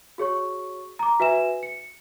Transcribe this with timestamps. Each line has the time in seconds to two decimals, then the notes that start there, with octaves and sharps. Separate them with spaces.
0.18 F#4 G#4 C#5 C#6
0.99 A#5 D6
1.20 F#4 B4 E5 G#5 E7
1.63 C#7